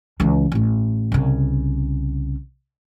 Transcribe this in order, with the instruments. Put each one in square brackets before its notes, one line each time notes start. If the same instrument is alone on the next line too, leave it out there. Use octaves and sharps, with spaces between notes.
[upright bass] C#2 E3
A1 A2
C2 C#3